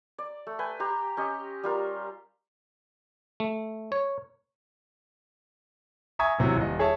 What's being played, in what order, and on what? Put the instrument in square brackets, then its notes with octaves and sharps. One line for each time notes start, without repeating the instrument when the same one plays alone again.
[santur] D5
A3
B4 G5 G#5
G4 A#5 C6
C#4 G4 D#5
G3 F4 A#4
[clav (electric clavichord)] A3
C#5
[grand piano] E5 G#5 A#5 C#6 D#6 G#6
A1 C3 F#3
D#1 D#5
G#4 C#5 E5 A5